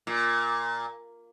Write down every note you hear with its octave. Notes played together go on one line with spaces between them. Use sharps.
A#2